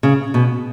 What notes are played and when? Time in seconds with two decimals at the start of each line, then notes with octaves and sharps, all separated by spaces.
0.03 C#3
0.34 B2